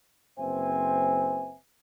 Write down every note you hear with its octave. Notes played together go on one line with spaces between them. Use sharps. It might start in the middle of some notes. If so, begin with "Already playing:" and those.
F#1 C4 B4 C5 E5 G#5